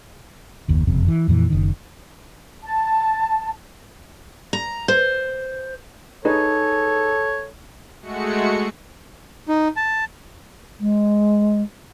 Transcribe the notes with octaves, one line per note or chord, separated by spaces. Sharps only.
F#1 D#2
F#1 F2 C3
E3
F2 A#2 E3
F#1 D#3
A5
A#5
C5
D#4 G#4 A4 B4 C#5
G#3 A3 F#4 C#7
D#4
A5
G#3